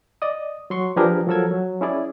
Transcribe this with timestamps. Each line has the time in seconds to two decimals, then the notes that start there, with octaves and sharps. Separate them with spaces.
0.22 D5 D#5 D#6
0.70 F#3 C6 C#6
0.96 F3 D4 G4 G#4 A#4 B4
1.27 F3 F#3 A4 A#4 E6 G#6
1.51 F#3
1.81 C#4 E4 G#4 D5